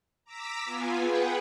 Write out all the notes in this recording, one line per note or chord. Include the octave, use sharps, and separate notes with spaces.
A#5 D6 E6 B6
B3 F4 G#5
G#4 B4 F#5 G5